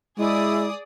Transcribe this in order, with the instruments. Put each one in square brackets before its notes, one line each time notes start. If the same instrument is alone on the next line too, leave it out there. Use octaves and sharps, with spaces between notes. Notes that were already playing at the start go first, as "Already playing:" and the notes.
[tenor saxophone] G#3 [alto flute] E4 [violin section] G#4 D5 D#6